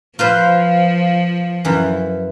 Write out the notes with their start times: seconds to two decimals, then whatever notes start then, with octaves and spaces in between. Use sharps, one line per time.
0.19 F3 F4 B4 C5
1.65 F#2 E3